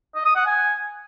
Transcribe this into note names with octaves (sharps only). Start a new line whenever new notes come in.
D#5
D#6
F#5
G#5